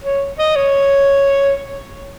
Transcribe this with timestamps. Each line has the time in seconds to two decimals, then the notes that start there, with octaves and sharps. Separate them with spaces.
0.04 C#5
0.39 D#5
0.56 C#5